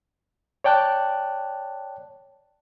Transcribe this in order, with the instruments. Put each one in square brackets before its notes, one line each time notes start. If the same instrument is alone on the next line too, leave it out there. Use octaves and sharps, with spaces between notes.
[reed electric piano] C#5 D5 G5 A5 F#6